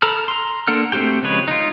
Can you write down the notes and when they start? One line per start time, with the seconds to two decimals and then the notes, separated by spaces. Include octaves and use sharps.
0.02 A4 A#5 B5 F6
0.28 A#5 C6
0.67 A#3 D4 A4 F#5 F6
0.92 A3 C4 F#4 G4 G5
1.23 C#3 F3 G#3 B4 C#5
1.48 D#4 F4